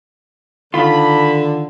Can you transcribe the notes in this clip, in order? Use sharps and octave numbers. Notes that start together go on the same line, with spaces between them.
D3 D#3 F4 B5